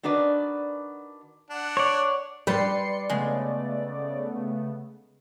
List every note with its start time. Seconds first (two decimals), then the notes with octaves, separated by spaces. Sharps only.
0.03 D#3 D4 F#4 B4 D5
1.50 D4 F#5
1.77 C#5 D5
2.47 G3 B4 D5 C6 C7 C#7
3.10 C#3 G#3 A3 B3